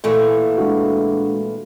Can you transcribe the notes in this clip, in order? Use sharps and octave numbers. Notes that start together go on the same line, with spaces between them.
A#2 E3 A3
G#3 D4 F#4